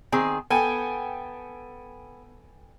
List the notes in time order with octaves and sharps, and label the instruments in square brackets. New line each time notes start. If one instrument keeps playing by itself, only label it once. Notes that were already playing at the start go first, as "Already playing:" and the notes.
[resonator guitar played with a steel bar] D#3 C4 G#4
[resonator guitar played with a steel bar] B3 [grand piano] A4 G5 G#5